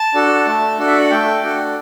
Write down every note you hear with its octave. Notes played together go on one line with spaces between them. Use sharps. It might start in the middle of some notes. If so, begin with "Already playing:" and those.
Already playing: A5
D4 F#4 A4
A3
D4 F#4 A4
E5
F#5
A3 G5
D4 F#4 A4